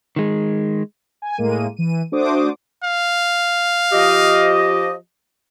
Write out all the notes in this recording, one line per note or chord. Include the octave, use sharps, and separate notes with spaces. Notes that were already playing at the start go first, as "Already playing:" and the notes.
D#3 G#3
G#5
A2 G#3 A#3 D#7
E3 D#7
A3 D4 F#4 C5 D6 D#6
F5
F3 G4 D#5